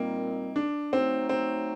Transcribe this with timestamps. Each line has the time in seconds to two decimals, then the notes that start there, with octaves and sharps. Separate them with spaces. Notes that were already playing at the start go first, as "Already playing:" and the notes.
Already playing: A#2 G3 A#3 C4 D#4
0.56 D4
0.92 F#3 A3 C4 D#4
1.29 C4